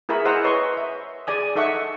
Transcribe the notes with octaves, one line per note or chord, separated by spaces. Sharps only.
E4 G#4 A#4 E5 B5 C#6
G#4 C5 D#5 F#5 A#5 E6
B4 C#5 D#5 C6 C#6
E5
G#4 D5 G#5 D#6
D#4 A4 D#5 E5 F#5 C#6